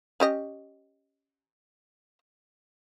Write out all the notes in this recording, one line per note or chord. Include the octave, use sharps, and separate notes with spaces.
C#4 G4 D#5